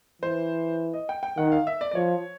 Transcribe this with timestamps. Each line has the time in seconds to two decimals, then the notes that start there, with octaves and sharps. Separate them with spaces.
0.22 E3 C5
0.94 D#5
1.09 G5
1.23 G5
1.37 D#3 F#5
1.52 F5
1.67 E5
1.81 D5
1.91 D5
1.95 F3 C#5